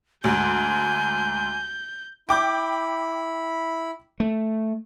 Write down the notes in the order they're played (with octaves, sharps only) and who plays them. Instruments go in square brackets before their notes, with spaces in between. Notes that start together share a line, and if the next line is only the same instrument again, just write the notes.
[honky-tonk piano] D2 G#2 [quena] G#5 [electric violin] G6
[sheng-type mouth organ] E4 B5 [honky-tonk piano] G5 D6 G6
[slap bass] A3